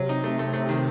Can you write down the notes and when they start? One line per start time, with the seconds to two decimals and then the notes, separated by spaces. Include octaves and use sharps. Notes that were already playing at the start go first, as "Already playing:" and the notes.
Already playing: C3 F#3
0.09 D#4
0.24 A3
0.39 A3
0.53 A3
0.69 D#3